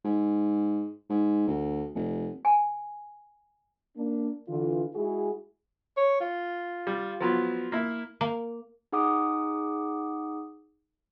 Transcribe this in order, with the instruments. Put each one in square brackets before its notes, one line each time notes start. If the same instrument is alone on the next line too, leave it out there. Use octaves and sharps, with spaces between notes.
[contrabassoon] G#2
G#2
D2
F1
[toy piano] G#5
[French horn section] A#3 D4
D3 E3 F4
G#3 E4 F#4 G#4
[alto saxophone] C#5
F4
[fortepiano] G3
F3 F#3 B3
A#3 E4
[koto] A#3
[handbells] D#4 G#4 F#5 D6 D#6